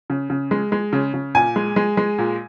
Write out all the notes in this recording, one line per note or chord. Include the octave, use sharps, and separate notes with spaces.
C#3
C#3
G#3
G#3
C#3
C#3
A#2 G#5
G#3
G#3
G#3
A#2